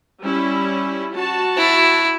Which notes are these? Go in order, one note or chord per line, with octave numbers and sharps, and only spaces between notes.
G3 C#4 E4
F#4 A5
E4